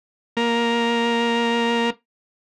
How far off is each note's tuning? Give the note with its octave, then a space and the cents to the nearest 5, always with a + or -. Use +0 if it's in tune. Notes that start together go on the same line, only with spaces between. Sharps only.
A#3 +5